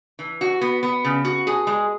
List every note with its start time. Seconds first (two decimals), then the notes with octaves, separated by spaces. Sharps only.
0.19 E3
0.41 F#4
0.61 B3
0.83 B3
1.05 C#3
1.25 F#4
1.47 G#4
1.67 G#3